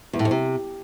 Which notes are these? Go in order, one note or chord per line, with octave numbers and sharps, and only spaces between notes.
E2
A2
F2
C3